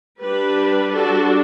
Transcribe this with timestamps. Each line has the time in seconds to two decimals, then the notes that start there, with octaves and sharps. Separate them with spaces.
0.22 G3 D4 G4 B4
0.94 F#4 A4